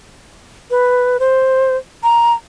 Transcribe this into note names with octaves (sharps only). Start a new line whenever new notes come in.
B4
C5
A#5